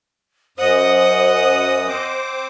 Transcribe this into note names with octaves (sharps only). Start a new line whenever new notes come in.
F#2 C5 D#5 F#5 D#6
C4 C5 D6